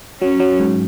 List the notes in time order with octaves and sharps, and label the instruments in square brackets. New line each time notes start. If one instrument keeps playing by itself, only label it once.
[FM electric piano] F#3 [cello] C#4
[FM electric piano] F#3
G#2